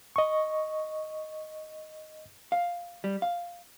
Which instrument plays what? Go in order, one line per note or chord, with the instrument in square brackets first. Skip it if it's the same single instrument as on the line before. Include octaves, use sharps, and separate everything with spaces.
[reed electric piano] D#5 C#6
[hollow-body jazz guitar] F5
G3
F5